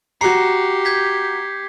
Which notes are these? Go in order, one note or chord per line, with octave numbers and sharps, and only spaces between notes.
F#4 G4 A#5 C7 C#7
G6 G#6 B6